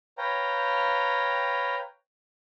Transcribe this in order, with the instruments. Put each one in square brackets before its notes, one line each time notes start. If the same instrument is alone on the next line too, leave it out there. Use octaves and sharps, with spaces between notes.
[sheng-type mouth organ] B4 C#5 F5 G5 A#5